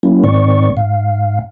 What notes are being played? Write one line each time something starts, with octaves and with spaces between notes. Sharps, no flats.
F#3 A#3 C#4 E4
G#2 D#3 C4 D5 C#6
G#2 F5